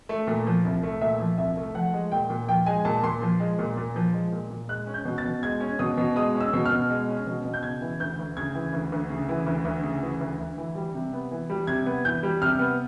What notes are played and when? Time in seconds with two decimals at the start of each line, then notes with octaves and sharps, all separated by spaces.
0.09 A3
0.27 A#2
0.47 F3
0.65 C2
0.83 A3
1.01 A#2 E5
1.20 F3
1.38 C2 E5
1.57 A3
1.74 F3 F#5
1.93 G#3
2.12 A#2 G5
2.30 A#2
2.48 F3 G5
2.66 G#3 G#5
2.85 A#2 A5
3.03 A#2 C6
3.22 F3
3.40 G#3
3.59 A#2
3.77 A#2
3.96 F3
4.13 G#3
4.32 A#2
4.50 A#2
4.69 G#3 F#6
4.87 C#4
4.94 G6
5.05 B2
5.18 A6
5.24 B2
5.43 G#3 G#6
5.60 C#4
5.79 B2 D#6
5.98 B2
6.16 G#3 D#6
6.35 C#4
6.40 E6
6.53 B2
6.65 F6
6.71 B2
6.90 G#3
7.08 C#4
7.27 B2
7.45 B2
7.53 G6
7.63 C#3 G#6
7.81 E3
8.00 D2 G6
8.19 D2
8.36 C#3 G#6
8.55 E3
8.73 D2
8.92 D2
9.10 C#3
9.29 E3
9.47 D2
9.65 D2
9.83 C#3
10.02 E3
10.21 D2
10.39 D2
10.57 E3
10.75 G3
10.94 C3
11.13 B3
11.31 E3
11.50 G3
11.67 C3 G#6
11.86 B3
12.05 E3 G6
12.23 G3
12.41 C3 F6
12.59 B3